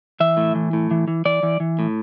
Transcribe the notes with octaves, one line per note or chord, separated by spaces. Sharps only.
E3 E5
A2
E3
A2
E3
E3
E3 D5
E3
E3
A2